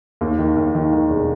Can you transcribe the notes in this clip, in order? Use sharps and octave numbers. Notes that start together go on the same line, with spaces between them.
D#2
D#3
D#2
D#3
D#3
E1